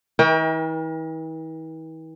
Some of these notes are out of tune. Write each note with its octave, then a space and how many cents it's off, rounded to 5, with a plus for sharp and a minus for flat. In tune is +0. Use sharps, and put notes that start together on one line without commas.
E3 -45 A#4 +35 G5 +30